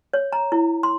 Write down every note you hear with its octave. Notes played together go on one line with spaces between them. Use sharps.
C#5
A#5
E4
C6